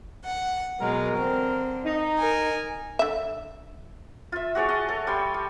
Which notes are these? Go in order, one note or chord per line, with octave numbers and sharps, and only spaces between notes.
F#5
B2 F#3 G#3 A#4
D3 C4
D#4
A#4 G#5
D3 E5
F4 E5
F#4 G#4 C#5 D5
F#4 D#5 A5
A4 C#5
G3 C#5 C6
G3